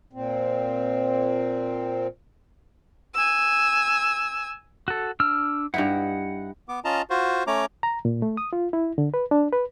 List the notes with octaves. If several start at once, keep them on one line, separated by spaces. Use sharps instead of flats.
A#2 C4
G#5 E6
F#4 A4
D4 E6 F6
G2 D#4 E4 F#5
B3 D6
C#4 F4 D#5 A5 A#5
F4 F#4 C5
A3 C#4 C#5 A#5 D6
A#5
A#2
A3
D#6
F4
E4
D3
B4
D4
B4